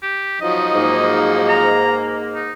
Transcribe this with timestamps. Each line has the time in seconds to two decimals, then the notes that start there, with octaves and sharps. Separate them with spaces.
0.03 G4
0.41 F3 F#3 D#4 D#5
0.74 G#2 A#3
1.49 A#5
2.35 D#4